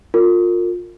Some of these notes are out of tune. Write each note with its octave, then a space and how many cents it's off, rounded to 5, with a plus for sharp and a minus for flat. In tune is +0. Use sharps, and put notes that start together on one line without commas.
F4 +25 A#4 -35